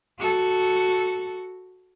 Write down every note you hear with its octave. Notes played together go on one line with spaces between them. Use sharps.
F#4 A4